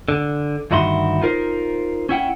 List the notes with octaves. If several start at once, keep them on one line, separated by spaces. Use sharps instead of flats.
D3
D2 G2 D#3 E4 F#4 C6
D#4 F4 A#4 C5
C#4 E4 F#5 G5